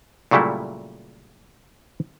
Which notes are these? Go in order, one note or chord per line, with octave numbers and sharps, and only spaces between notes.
A#2 C#3 F#3 G3 A3 E4